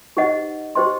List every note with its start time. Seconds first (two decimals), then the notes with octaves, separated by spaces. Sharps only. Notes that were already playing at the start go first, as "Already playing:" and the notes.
0.17 D#4 G4 C5 D#5 F#5
0.75 G4 C5 D#5 G5 C6